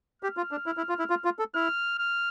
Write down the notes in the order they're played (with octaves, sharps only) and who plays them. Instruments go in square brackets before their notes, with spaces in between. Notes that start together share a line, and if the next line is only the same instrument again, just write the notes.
[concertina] G4 [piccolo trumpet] F6
[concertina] F4
D4
E4
E4
F4
E4
F4
F4
A4
[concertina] E4 [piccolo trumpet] F6
[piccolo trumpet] F6